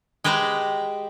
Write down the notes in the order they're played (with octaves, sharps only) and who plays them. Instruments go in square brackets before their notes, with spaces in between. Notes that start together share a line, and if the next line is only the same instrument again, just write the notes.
[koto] G#3 G4 B4 C5 A#5